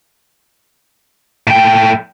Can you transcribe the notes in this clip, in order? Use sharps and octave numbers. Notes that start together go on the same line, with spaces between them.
A2 G5